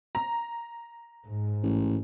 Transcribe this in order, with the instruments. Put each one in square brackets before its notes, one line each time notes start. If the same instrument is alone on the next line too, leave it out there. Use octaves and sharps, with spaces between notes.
[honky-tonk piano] A#5
[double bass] G#2
[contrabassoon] A1